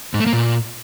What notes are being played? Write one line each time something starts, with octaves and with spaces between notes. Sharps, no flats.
G#2
A3
A#3
A#2